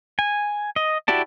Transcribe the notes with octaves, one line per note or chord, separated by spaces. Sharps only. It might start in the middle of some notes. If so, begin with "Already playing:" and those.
G#5
D#5
E4 F#4 G4 D5 A5